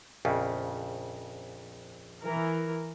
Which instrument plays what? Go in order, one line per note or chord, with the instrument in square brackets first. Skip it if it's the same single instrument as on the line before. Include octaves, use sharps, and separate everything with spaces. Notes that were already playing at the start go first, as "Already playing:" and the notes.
[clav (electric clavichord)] A#1 F2 C#3
[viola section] E3 A#4